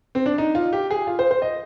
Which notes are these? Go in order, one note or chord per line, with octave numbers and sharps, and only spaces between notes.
C4
D4
D#4
F4
G4
G#4
F4
C5
C5
D#5